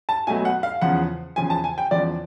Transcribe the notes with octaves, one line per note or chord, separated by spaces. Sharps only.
A5
B2 F#3 A3 G#5
F#5
F5
E2 C#3 F3 F#5
E2 C#3 F3 G#5
A5
G#5
G5
E2 C#3 F3 D5